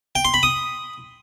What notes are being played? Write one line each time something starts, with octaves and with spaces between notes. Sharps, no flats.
G5
C6
B5
D#6